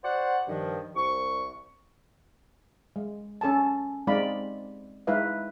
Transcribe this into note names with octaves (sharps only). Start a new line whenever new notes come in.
F#4 C5 D5 F#5
G2 D#3 F3
C2 C#6
G#3
C#4 A4 G#5 A5
G#3 C4 D#4 D5 F5 B5
G#3 D#4 E4 B4 E5 F5